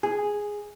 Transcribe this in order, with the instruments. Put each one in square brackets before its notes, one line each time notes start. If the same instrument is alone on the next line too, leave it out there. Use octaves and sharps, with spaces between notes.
[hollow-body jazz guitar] G#4